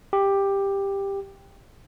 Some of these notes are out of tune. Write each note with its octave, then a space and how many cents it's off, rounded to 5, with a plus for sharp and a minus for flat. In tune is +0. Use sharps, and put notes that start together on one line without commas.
G4 +10